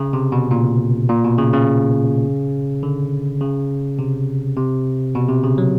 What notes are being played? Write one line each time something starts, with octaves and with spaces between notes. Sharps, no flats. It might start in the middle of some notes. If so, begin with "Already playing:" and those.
Already playing: C#3
C3
B2
A#2
A#2
B2
C#3
C#3
D3
C#3
C3
C3
B2
C3
C#3
F#3